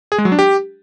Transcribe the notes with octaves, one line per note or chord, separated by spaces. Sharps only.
G#4
G#3
F#3
D4
G4